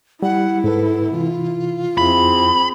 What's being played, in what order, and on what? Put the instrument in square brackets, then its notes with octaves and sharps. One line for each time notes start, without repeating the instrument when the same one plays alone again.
[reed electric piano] G3 [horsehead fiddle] E4 [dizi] F#5
[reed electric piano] G#2 B4 [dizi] A4
[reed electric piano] C3 E3 [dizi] F4
[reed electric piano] F2 E4 [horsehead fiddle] C4 G#4 [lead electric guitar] B5